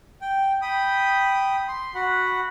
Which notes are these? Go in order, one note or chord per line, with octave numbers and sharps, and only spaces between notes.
G5
G5 B5 D#6
C6
F#4 F#5 B5